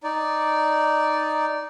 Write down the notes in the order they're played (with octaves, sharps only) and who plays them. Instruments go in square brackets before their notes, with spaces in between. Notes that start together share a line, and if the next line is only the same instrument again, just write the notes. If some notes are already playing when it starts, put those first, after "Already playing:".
[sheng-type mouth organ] D#4 D5